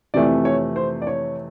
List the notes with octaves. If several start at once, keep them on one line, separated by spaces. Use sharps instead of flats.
F2 C3 E3 A3 D5
C#5
C5
D5
C#5